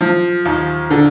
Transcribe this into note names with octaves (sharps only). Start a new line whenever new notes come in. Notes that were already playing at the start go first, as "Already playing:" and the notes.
F3
D#2
D3